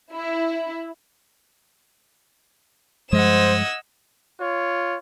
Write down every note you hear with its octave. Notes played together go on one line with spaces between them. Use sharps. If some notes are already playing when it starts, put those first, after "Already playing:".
E4
G2 F3 G#3 C5 D#5 F#5 E6 G#6
F4 C#5